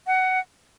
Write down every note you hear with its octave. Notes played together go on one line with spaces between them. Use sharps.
F#5